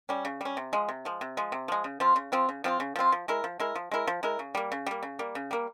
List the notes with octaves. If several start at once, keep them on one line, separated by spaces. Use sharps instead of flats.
G3 C#4
C#3
G3 C#4
C3
F3 G#3
C3
F3 G#3
C3
F3 G#3
C3
F3 G#3
C#3
F3 C4 F4
C#3
F3 C4 F4
C#3
F3 C4 F4
C#3
F3 C4 F4
F3
G#3 E4 A#4
F3
G#3 E4 A#4
F3
G#3 E4 A#4
F3
G#3 E4 A#4
C#3
G3 A#3
C#3
G3 A#3
C#3
G3 A#3
C#3
G3 A#3